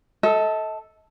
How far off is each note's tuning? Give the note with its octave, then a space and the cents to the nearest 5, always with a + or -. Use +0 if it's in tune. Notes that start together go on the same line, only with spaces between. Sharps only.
A4 +0 D#5 +45